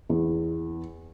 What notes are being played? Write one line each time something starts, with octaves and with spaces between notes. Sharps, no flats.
E2